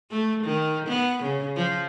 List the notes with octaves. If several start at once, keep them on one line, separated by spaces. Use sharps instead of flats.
A3
D#3
B3
C#3
F3